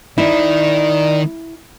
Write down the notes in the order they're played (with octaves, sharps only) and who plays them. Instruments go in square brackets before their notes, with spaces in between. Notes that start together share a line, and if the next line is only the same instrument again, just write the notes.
[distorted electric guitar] D#3 D#4 [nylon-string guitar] E4 [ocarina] D5